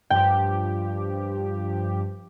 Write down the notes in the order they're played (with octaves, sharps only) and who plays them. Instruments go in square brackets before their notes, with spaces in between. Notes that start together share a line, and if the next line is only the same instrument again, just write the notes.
[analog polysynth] G2 F3 G4 [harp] G5